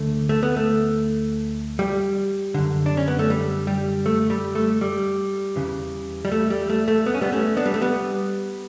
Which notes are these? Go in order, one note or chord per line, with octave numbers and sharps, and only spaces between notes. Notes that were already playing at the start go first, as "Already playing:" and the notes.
Already playing: D2 D3 A3
A3
B3
A3
G3
F#2 D3
D4
C#4
B3
A3
G3
G3
A3
G3
A3
G3
E2 C#3 E3
G3
A3
G3
A3
A3
B3
C#4
G3 B3
A3 C#4
B3 D4
G3
A3
G3 B3